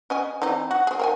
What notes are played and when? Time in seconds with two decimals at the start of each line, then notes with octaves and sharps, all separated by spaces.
0.10 C#4 D#5 G#5
0.42 E3 C4 D#4
0.71 F#4
0.87 C4 G#4
1.00 A#4 G5 G#5